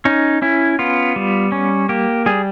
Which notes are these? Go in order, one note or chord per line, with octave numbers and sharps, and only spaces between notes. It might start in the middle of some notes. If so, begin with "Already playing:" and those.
C#4 D#4
C#4 E4
B3 F4
G3
C#4
A#3 G4
G3 G#4